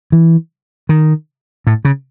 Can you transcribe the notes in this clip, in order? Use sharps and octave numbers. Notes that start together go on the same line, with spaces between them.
E3
D#3
A2
C#3